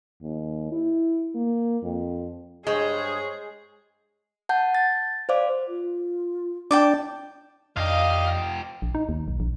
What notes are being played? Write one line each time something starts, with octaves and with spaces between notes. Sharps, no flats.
D#2
E4
A#3
F2
G2 G#3 G#4 C5 C#5
F#5 A5 G6
A6
C5 D5 F5 D6
F4
D4 G5 A5 D6
F2 D#3 F3 D4 G4 D#5 F5
A#1
D#4
D#2
B1
A#1